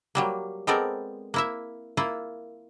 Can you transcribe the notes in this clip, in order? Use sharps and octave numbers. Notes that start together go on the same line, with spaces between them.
F#3 G3 A#3
G#3 B3 C4 A4 A#4 D5
A#3 E4 E5
A#3 E4 F4